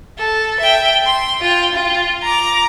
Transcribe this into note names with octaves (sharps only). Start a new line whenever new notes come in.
A4
E5 G5
C6
F4 G5
F4
A#5 D6